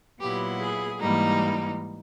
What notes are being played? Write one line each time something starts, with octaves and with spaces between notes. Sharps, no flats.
A#2 F#3 B3 E4 G4
G#4
G#2 E3 G3 A#3 D#4